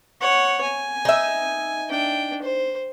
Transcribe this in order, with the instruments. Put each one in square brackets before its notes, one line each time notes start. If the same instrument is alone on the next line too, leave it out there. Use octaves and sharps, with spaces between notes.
[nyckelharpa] C#5 F#5
G#5
[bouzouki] D#4 E5
[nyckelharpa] D4 G5
C5